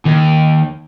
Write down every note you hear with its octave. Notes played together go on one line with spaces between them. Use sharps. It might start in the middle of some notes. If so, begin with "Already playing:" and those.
D#2